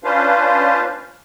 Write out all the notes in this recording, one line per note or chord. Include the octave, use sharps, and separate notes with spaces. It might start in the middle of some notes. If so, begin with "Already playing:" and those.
C#4 D4 F4 B4 C5 F5